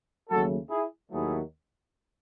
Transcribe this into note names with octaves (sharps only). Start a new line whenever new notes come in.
D#2 C#3 F#3 A3 F#4 A4
E4 G#4
D#2 D#3 F#3 A3 E4 G#4